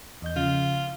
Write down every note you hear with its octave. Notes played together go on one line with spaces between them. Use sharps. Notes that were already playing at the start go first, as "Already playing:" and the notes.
E2 D#5 G6
C#3 F3 F4